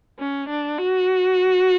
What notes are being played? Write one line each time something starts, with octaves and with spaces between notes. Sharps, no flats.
C#4
D4
F#4